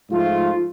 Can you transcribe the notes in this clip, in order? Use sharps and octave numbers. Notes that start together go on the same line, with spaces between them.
G#2 F3 A3 F4